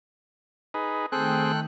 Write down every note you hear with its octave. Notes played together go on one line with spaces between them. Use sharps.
D#4 G#4 B4
D#3 A3 C4 G#4 A4 G5 F#6